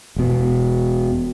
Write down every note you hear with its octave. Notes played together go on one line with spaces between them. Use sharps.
E1 B2